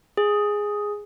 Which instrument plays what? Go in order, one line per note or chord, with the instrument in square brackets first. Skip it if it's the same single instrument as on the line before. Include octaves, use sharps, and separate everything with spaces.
[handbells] G#4